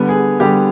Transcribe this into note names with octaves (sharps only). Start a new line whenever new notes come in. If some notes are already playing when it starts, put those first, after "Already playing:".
Already playing: D3 G3 B3
G#4
D3 G3 B3 G4